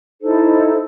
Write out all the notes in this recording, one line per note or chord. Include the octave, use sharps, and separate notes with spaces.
D#4 E4 A4 C5